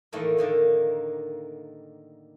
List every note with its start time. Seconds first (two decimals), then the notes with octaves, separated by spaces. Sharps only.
0.12 A2 D#3 E3 A3 A#3
0.37 A2 D3 D#3 A#3